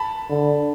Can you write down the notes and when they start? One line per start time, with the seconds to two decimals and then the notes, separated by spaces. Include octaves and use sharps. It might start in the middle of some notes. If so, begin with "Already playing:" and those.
Already playing: A5 B5
0.29 D3